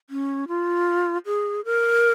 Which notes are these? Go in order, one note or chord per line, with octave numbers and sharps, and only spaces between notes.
C#4
F4
G#4
A#4